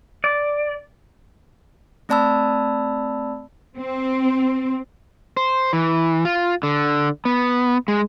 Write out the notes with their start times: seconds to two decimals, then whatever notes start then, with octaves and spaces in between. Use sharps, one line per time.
0.24 D5
2.09 A3 C4 D5 A5 B5 E6
3.77 C4
5.37 C5
5.73 E3
6.25 F4
6.63 D3
7.25 B3
7.88 G#3